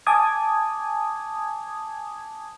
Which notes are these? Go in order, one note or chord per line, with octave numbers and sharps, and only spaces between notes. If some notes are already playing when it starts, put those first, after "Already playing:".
G#5 A5 D6 D#6 G#6